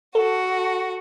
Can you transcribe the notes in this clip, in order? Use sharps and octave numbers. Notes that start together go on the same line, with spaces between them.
F#4 A4